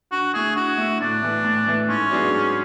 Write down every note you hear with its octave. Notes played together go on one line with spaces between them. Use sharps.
D3 F#4
A3 E4 G#4
D3 F#4
A3 E4
A2 D4
E3 A3
A2
E3 A3
G#2 C#4
F#3 B3 D4 G#4
G#2